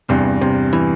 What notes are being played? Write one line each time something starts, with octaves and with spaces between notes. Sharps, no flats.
E2 G2 C3
C3
E3